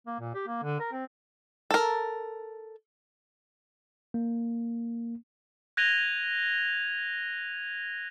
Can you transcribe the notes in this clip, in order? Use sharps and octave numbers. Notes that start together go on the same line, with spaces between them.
A#3
A#2
G4
A#3
D3
A#4
C4
A4 A#4
A#3
F#6 G#6 A#6 D#7 F7 G7